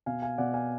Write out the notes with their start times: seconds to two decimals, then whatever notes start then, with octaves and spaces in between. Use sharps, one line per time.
0.06 B2 F5 G#5
0.22 F5 G#5
0.38 B2 D5 F#5
0.54 F5 G#5